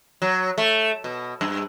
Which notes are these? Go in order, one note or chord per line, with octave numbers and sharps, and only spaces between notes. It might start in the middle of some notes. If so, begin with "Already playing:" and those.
F#3
A3
B2
G2